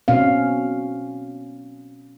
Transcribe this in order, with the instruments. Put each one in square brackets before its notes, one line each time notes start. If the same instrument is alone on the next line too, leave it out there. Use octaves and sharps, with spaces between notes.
[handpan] B2 C4 C#4 F5